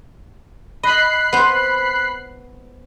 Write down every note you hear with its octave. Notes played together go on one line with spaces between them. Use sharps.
D#5 B5 F#6 C7
B3 C5